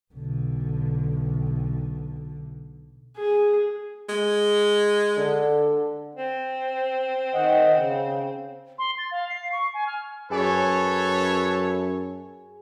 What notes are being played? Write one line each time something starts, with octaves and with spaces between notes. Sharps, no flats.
B1 D3
G#4
G#3
D3
C4
D#3 D#5 F#5
C#3
C6
A6
F5
C7
C#6
G#5
F6
F#2 G#4 A4 B4 C#5 G#5